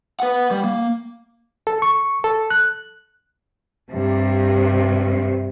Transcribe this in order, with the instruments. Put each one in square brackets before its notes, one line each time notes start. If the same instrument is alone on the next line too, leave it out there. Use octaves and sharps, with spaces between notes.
[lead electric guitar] B4 F#5
G3
A#3
[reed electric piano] A4
C#6
A4
F#6
[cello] G2 C3